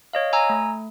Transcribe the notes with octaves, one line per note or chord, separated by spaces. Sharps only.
C#5 D#5 F5
G#5 A#5 E6
A3